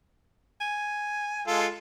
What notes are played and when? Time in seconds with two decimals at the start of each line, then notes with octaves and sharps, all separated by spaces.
0.61 G#5
1.47 G#3 F4 A4